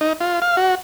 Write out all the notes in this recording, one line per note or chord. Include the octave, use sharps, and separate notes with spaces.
D#4
F4
F5
F#4